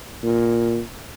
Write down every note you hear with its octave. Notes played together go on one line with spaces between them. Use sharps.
A#2